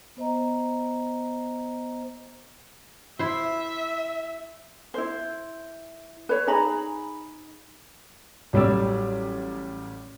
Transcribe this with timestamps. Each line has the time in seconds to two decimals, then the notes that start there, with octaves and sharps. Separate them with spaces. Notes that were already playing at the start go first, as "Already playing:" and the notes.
0.17 B3 C5 D#5 A#5
3.19 E4 C5 E5
4.94 E4 C5
6.29 B4 C#5
6.47 D#4 G#4 A#5 B5
8.53 A1 F#3 G3 C#5 D5 E6